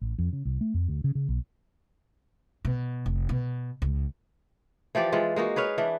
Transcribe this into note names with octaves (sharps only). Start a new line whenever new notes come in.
A1
F2
C#3
C2
A3
F2
D2
C#3
C#3
B1
B2
F1
B2
C#2
E3 F3 G4 D5
E3 G#3 F4
G#3 A#3 D#4 F#4
G#4 B4 C#5 F5
E3 D4